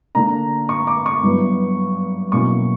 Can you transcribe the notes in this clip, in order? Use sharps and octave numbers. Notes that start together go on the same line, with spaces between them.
D3 A#3 D4 A#5
C#6
D6
C#6
G2 F#3 B3 E4
B2 F#3 A#3 C#4 E4 C#6